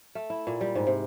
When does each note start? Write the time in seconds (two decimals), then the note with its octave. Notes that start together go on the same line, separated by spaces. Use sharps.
0.15 A3
0.30 E4
0.47 A#2
0.61 G3
0.75 G#2
0.87 C3